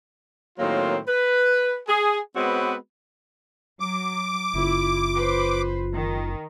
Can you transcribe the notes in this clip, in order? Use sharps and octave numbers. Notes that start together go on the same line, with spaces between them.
A2 D#3 F#3 A#3 C4 F4
B4
G#4
G#3 B3 C4 F#4 B4 C#5
F#3 D6
F#1 E4 F4
B4 C5
D#3